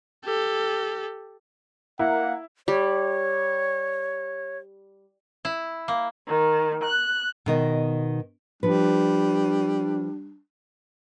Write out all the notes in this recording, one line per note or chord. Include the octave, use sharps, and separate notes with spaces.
G4 A4
A#3 E4 F#5
G3 C#5
E4
A#3
D#3
F#6
B2 D#3 D#5
F3 G3 D4 B4